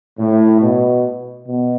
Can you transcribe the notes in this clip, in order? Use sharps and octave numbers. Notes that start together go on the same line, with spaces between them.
A2
B2
B2